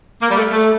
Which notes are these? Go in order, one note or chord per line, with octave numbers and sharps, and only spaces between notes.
A#3
G3
A3
A3